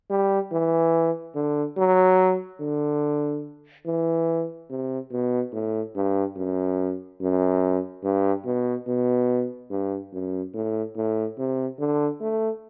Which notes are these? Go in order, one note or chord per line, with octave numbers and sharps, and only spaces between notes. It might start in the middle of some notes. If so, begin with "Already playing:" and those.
G3
E3
D3
F#3
D3
E3
C3
B2
A2
G2
F#2
F#2
G2
B2
B2
G2
F#2
A2
A2
C3
D3
A3